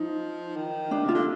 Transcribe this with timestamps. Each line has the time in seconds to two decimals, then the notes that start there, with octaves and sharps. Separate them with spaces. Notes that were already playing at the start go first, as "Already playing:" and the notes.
Already playing: F3 D#4
0.57 D#3
0.91 D4
1.05 C3 F4
1.15 D3